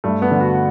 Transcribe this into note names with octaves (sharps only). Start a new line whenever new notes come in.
G2 A3
B3
D3
F#4